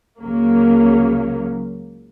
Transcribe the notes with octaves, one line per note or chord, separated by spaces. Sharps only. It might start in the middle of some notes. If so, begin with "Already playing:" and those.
C#2 C#3 F#3 A#3